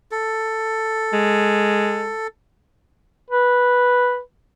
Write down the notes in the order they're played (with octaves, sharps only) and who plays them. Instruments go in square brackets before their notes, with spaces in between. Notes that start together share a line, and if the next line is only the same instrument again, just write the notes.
[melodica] A4
[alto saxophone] G#3
[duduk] B4